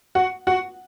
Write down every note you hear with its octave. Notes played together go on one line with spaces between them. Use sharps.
F#4 F#5
F#4 F#5